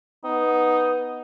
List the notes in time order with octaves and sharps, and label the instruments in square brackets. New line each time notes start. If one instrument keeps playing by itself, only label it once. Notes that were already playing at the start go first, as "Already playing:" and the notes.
[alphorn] B3 [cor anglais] D#4